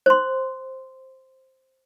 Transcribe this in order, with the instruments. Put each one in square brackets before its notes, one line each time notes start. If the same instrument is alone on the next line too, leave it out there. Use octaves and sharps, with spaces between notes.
[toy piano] C5 C6